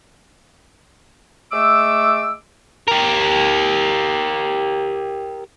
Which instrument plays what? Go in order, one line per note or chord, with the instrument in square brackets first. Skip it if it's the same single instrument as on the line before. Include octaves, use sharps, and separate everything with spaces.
[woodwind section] G#3 A3 D6 E6
[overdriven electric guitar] G4 A#4